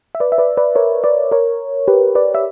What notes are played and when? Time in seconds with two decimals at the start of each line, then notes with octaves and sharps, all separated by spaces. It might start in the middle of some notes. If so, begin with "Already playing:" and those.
0.15 E5
0.20 B4 D5
0.32 E5
0.38 B4 D5
0.57 B4 D5
0.76 A#4 C#5
1.04 B4 D5
1.32 A#4 C#5
1.88 G4 B4
2.15 B4 D5
2.35 E5